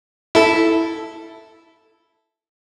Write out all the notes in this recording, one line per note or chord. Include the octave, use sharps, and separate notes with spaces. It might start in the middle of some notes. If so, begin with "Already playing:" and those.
E4 A4